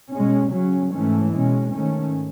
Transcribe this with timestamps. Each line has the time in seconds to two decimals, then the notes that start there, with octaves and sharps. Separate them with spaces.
0.11 B2 G#3 C#4
0.52 C#3 F#3 C#4
0.92 G#2 E3 A3 C#4
1.32 B2 G#3 C#4
1.72 G#2 D#3 A3 C#4